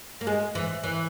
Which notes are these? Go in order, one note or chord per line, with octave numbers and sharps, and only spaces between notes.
A#3
G#3
E3
E3